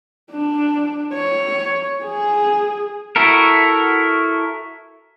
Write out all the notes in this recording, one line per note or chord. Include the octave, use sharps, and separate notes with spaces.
D4
C#5
G#4
E4 F#4 A4 A#4